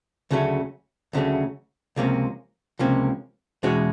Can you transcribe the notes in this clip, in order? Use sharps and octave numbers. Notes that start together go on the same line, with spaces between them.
D2 C#3 F#3 A3 C#4
D2 C#3 F#3 A3 C#4
C#2 C3 F3 A#3 C#4
C#2 C3 F3 A#3 C#4
E2 B2 G#3 C#4 F#4